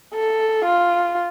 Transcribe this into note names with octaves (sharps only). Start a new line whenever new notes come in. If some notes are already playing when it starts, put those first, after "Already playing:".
A4
F4